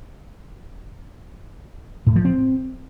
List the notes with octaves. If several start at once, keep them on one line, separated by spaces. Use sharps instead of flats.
A2
F3
C4